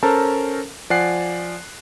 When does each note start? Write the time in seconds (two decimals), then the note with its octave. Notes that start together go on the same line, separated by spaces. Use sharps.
0.03 C#4 A4 A#4 C5 A5 A#5
0.90 F3 D5 F#5 G#5 F#6 C7